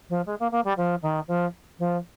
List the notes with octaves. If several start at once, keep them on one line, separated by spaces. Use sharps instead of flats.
F3
G#3
A#3
A#3
G3
F3
D#3
F3
F3